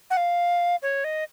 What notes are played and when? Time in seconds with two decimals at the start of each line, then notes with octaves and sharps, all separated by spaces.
0.10 F#5
0.17 F5
0.82 C#5
1.04 D#5